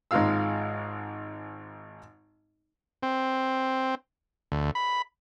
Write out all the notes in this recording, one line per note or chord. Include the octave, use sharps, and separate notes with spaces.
G#1 G#2 G#3 F4 F5 E6
C4
D2
B5